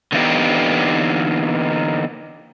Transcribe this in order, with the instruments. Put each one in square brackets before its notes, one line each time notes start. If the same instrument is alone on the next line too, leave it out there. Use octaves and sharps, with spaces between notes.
[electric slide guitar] D3 E3 A#3 B3 D#4 G4